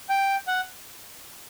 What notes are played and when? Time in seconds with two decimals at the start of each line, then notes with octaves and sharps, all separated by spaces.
0.09 G5
0.47 F#5